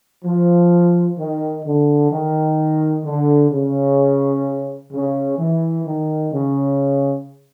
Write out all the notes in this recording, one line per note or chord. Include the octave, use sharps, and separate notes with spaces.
F3
D#3
D3
D#3
D3
C#3
C#3
E3
D#3
C#3